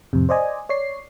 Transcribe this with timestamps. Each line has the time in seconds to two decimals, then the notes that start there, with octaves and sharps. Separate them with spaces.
0.13 F2 A2 C3
0.29 C5 D5 D#5 G#5
0.69 C#5 D5 C7